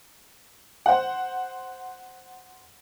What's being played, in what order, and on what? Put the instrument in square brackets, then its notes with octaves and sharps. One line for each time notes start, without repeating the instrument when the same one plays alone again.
[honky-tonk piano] C5 F#5